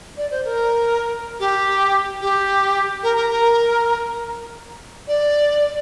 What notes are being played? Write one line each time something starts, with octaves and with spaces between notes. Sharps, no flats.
D5
C5
A#4
G4
G4
A#4
A#4
A#4
D5